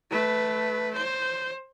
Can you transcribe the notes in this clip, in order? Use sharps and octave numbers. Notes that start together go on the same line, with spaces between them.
A3 B4
C5